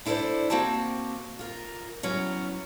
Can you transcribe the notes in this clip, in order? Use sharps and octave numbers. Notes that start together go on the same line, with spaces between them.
D4 E4 A4 A#4 C5 D5
A#3 C4 F#4 G5 A5
F4 A#4
F#3 B3 C#4 E4